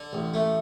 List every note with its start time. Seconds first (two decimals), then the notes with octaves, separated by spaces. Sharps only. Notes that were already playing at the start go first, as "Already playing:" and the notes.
Already playing: D3
0.13 A1
0.34 A3